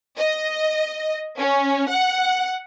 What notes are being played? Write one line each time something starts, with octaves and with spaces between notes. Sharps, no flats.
D#5
C#4
F#5